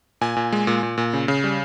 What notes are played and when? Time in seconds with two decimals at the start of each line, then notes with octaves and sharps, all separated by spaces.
0.21 A#2 G#5
0.37 A#2
0.52 G#3
0.67 A#2
0.83 A#2
0.98 A#2
1.13 C#3
1.28 C#3
1.44 G3